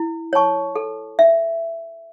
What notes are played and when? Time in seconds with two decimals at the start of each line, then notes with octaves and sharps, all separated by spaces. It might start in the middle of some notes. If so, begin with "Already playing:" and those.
Already playing: E4
0.33 C#5 A5 C#6
0.76 A4
1.19 E5